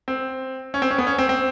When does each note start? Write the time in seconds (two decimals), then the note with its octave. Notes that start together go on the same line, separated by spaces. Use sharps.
0.08 C4
0.74 C#4
0.82 C4
0.90 C#4
0.98 B3
1.07 C#4
1.18 C4
1.29 C4